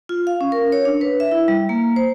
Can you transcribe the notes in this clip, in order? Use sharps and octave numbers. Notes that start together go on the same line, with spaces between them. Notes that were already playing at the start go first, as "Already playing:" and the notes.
F4
F5
C#4
A#4
C#5
D4
B4
E5
E4
G3
A#3
C5